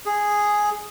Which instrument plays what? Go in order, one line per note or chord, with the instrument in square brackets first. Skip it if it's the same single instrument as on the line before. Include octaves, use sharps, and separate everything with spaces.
[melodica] G#4